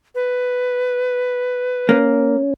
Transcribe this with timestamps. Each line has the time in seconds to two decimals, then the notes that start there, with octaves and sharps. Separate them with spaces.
0.15 B4
1.89 A#3 C#4